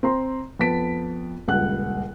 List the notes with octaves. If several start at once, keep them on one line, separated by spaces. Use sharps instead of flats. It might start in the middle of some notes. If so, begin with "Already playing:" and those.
C4 A#5 C6
F2 B3 A5 B6 D7
D#1 C#2 G2 F#5 F#6